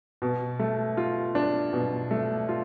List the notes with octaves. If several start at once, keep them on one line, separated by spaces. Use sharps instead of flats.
B2
A3
F4
D4
B2
A3
F4